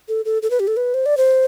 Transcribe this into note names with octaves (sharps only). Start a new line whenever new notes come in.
A4
A4
A4
B4
G4
A4
B4
C5
D5
C5